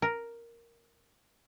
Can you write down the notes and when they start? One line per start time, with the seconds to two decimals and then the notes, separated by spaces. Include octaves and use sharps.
0.02 A#4